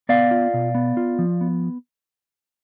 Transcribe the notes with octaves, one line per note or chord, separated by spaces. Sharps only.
B3 D5 F5
F4
B2
B3
F4
F3
B3